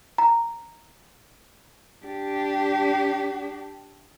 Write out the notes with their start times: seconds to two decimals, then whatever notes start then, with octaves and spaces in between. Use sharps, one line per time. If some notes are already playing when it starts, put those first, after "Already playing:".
0.18 A#5
2.05 D4 G4